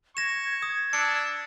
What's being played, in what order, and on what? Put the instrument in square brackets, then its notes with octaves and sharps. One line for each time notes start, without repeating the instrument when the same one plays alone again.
[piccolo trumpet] C#6 [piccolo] G#6 [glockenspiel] A#6 E7
[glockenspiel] D#6 [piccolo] G#6
[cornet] D4 [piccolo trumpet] E6 [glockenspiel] C#7